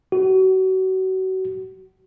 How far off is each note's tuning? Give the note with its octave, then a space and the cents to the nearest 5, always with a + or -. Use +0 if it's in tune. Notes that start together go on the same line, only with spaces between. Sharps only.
F#4 +30